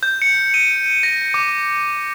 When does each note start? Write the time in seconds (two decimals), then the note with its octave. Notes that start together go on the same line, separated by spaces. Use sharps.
0.03 G6
0.22 C#7
0.54 D#7
1.03 A#6
1.34 D6